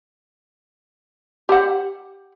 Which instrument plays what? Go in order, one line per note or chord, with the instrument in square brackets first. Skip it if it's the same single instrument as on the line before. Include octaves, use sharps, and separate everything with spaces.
[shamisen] G4 C5 F#5